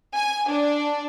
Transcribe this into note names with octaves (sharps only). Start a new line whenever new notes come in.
G#5
D4